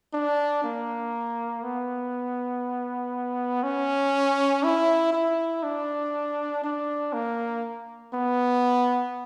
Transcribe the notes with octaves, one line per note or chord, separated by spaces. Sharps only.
D4
A#3
B3
C#4
E4
E4
D4
D4
A#3
B3